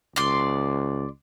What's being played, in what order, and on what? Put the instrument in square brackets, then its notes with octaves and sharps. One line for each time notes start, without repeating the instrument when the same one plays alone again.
[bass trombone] C#2 [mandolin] D5 C6